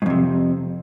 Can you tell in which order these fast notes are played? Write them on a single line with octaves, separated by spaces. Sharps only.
G#2 F2 C3